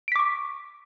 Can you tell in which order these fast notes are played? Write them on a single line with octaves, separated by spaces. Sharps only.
D7 B6 D6 C#6